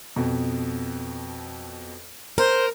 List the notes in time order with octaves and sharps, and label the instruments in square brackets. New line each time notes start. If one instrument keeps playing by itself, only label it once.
[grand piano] F2 B2
[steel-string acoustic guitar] A#4 [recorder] C5